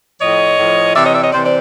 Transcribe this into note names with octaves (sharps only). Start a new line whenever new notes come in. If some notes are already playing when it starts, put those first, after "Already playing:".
A2 F3 C#5 D#5
A2 F3
C3 E3 D5 E5
C#5 D#5
D5 E5
C#5 D#5
C3 E3 C5 D5
C5 D5